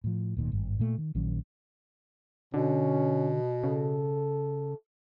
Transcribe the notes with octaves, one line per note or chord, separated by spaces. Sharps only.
A2 F3
D1 A#2 D#3
G#1 G2
A#2 A3
D#3
A#1 D#3 F#3 C#4
B2 D3 C#4
C#3 A4